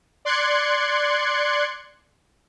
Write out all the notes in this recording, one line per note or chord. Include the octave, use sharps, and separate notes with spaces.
D5 C6 F#6 G#6 C#7